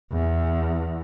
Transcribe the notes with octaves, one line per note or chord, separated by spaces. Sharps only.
E2